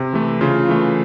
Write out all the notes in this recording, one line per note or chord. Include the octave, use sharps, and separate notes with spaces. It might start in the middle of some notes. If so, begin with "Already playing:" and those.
Already playing: C3
E3 A3
C#3 F4
E3 A3